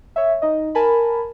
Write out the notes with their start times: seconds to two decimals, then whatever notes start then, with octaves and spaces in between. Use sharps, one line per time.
0.16 C#5 E5
0.42 D#4 D#5
0.75 A#4 G#5 A5 B5